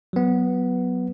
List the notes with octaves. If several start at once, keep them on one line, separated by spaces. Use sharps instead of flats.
F#3 B3